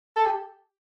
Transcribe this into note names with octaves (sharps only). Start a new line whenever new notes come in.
A4
G4